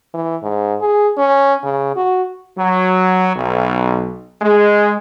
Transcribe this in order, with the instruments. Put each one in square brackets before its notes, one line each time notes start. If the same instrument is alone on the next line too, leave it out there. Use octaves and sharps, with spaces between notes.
[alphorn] E3
G#2
G#4
C#4
C#3
F#4
[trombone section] F#3
B1
G#3